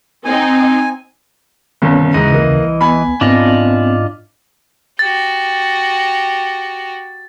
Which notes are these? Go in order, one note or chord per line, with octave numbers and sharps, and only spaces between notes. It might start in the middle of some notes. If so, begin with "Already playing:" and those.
C4 D#4 G#5
G1 C2 D#3 B3 C#4
D#2 G#2 C#3 E3 D#5
C2 A#3
B3 G#5 B5
G#2 B3 C4 D4 F4 D#5
F#4 G4 A6